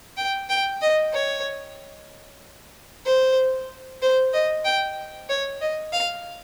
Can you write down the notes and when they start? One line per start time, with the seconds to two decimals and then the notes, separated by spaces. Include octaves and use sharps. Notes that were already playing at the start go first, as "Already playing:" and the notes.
0.17 G5
0.49 G5
0.82 D#5
1.13 C#5
3.06 C5
4.02 C5
4.33 D#5
4.65 G5
5.29 C#5
5.61 D#5
5.93 F5